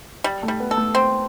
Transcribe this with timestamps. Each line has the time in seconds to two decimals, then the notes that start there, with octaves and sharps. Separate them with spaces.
0.24 G3
0.43 A3
0.48 G3
0.60 B3
0.71 A4
0.77 A3
0.95 C4